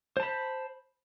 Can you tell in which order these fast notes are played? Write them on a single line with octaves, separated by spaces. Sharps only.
C5 A5 B5